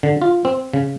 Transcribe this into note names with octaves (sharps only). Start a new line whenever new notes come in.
D3
F4
C4
C#3